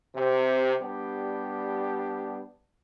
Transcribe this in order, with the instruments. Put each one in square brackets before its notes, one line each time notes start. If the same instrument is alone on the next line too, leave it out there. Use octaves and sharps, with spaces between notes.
[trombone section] C3
G3 B3 D4 G4